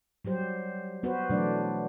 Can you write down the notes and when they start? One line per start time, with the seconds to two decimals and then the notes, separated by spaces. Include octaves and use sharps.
0.25 F#3 G3 G4 C5
1.03 B3 F#4 B4 C5
1.29 B2 E3 F#3 A3 D4 D5